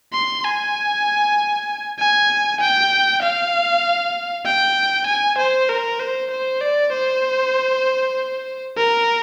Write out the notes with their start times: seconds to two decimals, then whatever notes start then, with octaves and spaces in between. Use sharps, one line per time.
0.13 C6
0.44 G#5
1.99 G#5
2.60 G5
3.22 F5
4.46 G5
5.07 G#5
5.38 C5
5.69 A#4
5.99 C5
6.31 C5
6.61 D5
6.92 C5
8.77 A#4